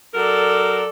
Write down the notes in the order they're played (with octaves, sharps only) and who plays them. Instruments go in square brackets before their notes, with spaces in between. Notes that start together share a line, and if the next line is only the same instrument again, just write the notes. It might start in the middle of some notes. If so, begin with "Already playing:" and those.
[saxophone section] F#3 A#4 [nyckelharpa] A4 D5